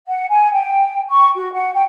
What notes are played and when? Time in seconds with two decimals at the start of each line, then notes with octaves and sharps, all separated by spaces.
0.07 F#5
0.29 G#5
0.53 G5
1.11 C#6
1.35 F#4
1.53 F#5
1.73 G5